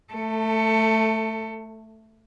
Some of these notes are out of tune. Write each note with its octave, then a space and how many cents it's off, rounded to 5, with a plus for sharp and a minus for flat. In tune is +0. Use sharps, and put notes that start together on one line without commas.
A3 +0 A4 +25